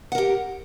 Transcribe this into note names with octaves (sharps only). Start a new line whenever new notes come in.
G4 A#4 F#5